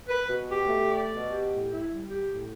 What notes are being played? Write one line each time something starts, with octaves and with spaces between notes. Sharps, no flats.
B4
B2
G4
A3
D5
B2
G4
A2
E4
G3
G4
A2